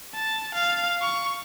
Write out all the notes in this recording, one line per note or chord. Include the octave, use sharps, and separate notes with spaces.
A5
F5
C#6